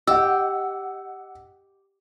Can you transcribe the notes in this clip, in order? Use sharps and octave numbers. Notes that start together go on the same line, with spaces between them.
G4 D#5 F#5 E6